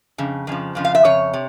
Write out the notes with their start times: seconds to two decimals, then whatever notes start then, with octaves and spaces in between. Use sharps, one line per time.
0.18 F2 C#3
0.47 F2 C#3 F3
0.75 F2 C#3 F3
0.85 F5
0.95 E5
1.04 F2 C#3 C#5
1.33 C3